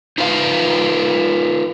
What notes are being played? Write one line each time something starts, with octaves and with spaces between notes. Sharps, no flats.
D#4 F4 B4 F5